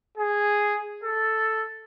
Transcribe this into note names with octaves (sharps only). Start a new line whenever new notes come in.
G#4
A4